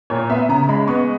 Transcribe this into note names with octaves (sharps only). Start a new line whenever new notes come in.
A#2 C#5
B3 E5
C#3 A#5
G#3 B5
B3 C#6